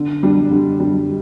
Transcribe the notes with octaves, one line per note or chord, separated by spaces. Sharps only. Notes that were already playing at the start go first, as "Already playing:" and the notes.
Already playing: D3
G3 D4
D3
G3 D4